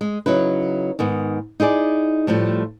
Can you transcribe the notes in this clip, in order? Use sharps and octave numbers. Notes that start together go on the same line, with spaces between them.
G#3
C#3 F#3 D#4 E4 B4
G#2 D#3 B3
D#4 E4 G#4 D5
A2 F3 G3 A3